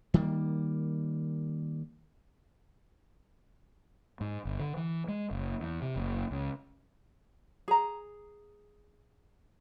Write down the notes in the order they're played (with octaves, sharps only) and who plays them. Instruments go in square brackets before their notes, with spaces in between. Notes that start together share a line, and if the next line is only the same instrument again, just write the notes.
[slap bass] D#3 G3 A#3
[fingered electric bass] G#2
G1
D3
E3
G#3
F#1
E2
C3
F#1
C#2
[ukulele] G#4 A#5